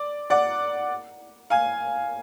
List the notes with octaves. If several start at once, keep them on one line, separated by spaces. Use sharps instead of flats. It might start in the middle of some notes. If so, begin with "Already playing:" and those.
Already playing: D5
D5 F#5
F5 G#5